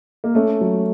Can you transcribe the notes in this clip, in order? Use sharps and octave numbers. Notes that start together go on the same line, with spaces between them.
A#3
A3 C#4
F#3